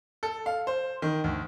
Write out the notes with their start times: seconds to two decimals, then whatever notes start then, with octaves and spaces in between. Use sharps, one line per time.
0.23 A4
0.46 F5
0.67 C5
1.02 D#3
1.24 D2